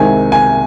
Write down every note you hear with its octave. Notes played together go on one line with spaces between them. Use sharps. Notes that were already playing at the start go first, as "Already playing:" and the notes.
Already playing: C2 C3 D#3 G#3 C4 G#5
G#5